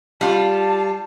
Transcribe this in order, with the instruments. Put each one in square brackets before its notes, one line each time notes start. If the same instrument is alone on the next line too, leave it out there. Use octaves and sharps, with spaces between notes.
[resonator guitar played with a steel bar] G3 F4 [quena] A5